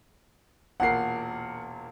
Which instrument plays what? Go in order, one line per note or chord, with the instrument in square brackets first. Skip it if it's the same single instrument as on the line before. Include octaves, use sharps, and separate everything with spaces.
[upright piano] E1 A#2 A#4 [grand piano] F#5 C7